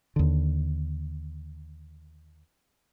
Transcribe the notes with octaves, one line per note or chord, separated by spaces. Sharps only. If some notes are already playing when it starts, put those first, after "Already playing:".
D#2 D3